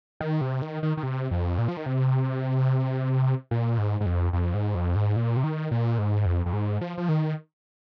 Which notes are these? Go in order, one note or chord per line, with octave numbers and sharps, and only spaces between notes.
D#3
C3
D#3
D#3
D#3
C3
F2
A#2
F3
D#3
C3
A#2
G#2
G#2
F2
F2
G#2
F2
G#2
A#2
C3
D#3
A#2
G#2
F2
F2
G#2
F3
F3
D#3